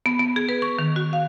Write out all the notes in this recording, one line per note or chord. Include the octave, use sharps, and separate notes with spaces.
B3
B3
G#4
B4
C#6
D#3
F#4
F5